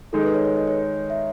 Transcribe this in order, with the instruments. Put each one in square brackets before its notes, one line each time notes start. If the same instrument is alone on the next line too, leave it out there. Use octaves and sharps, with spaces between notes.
[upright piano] D#3 G#3 D#4 [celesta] A4
[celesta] B4
C#5
C#5
D#5
C#5
E5